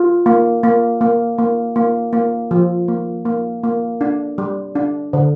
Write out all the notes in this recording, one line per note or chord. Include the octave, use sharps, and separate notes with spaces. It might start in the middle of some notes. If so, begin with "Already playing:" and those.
Already playing: F4
A#3
A#3
A#3
A#3
A#3
A#3
F3
A#3
A#3
A#3
D4
G3
D4
D3